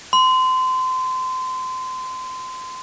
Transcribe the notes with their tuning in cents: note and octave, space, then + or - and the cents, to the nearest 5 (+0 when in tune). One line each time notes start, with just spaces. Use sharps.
C6 -30